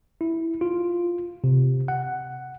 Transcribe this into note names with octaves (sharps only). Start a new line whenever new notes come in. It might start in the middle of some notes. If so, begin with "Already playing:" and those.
E4
F4
C3
F#5